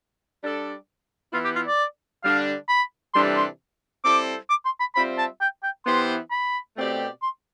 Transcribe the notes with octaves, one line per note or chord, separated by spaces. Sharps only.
G3 D4 A4 D5
E3 B3 E4 F4
G4
F4
D5
D3 G3 D4 F5
B5
C3 E3 G3 D4 A4 C6
C6
G3 C4 E4 A4 C5 D6
D6
C6
B5
G3 C4 F4 C5 E5 B5
A5
G5
G5
E3 B3 E4 G4 C5 C6
B5
B2 A3 C4 G4 D5
C6